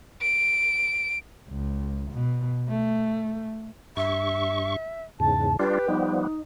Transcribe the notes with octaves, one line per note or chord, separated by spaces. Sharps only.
D7
C#2
B2
A3
G2 E5 C#6
E2 G#2 C#3 A5
G3 D4 F4 G4 B4
F3 G3 B3 D#4